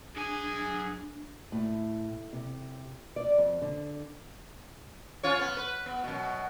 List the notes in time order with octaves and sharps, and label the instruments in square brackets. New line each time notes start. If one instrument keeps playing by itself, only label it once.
[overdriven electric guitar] F#2 G#5 [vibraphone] D4 [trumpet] G#4
[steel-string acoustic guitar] A2
C3
D5
F2
D3
[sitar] C#4 F4 C#5
B3
B4
B3
F#2 B2